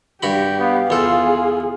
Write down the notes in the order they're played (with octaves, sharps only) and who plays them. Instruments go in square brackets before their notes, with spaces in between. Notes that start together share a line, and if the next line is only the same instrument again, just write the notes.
[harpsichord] G2 F#4 B5 [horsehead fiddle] G4
[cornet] B3 [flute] F5
[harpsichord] E2 A4 [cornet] F4 [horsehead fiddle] G#4